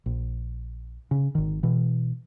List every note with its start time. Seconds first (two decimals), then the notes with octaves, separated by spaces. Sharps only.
0.06 A#1
1.11 C#3
1.35 G#1 D#3
1.63 B2 E3